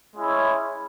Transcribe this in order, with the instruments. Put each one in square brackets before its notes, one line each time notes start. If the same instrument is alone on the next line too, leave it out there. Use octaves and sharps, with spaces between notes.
[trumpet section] G#3 C#4 E4